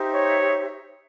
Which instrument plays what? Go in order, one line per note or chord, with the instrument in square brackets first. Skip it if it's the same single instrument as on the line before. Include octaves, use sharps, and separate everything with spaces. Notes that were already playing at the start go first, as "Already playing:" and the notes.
Already playing: [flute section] D#4 G4 C5 E5
[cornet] C#5